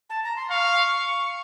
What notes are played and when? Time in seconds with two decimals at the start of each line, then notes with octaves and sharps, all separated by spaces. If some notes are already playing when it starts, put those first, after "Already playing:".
0.10 A5
0.24 A#5
0.36 C6
0.50 F5 C#6